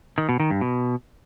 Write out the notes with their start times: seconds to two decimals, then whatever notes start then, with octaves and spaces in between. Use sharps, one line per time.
0.18 D#3
0.29 B2
0.40 D#3
0.50 G2
0.61 B2